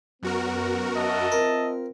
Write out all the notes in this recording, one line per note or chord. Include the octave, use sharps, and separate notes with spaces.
F#2 B3 F#4 A#4
D#5 E5 A5
C4 F4 A#4